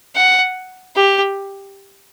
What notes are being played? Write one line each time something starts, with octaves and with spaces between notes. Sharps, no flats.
F#5
G4